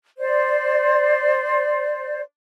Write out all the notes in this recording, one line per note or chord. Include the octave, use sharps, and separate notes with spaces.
C5 D5